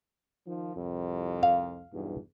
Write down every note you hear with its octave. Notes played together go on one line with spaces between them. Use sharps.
D#3 F3
C2 F2
F5
B1 E2 G2